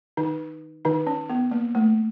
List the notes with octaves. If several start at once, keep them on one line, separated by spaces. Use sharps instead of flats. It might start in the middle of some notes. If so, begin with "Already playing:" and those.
D#3 D#4
D#3 D#4
C#4
B3
A#3
A3